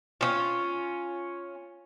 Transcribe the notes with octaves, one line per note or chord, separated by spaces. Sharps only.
C#4 F4